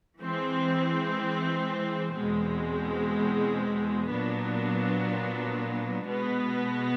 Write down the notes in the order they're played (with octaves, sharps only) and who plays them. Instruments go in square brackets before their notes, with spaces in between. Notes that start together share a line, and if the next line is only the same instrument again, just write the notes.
[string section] E3 G#3 C4
E2 B2 G#3 C4
A#2 F#3 B3 D4
B2 G#3 B3